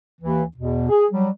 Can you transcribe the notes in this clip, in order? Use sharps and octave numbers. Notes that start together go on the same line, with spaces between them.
D#2 E3
E2 B2
G#4
F#3 G3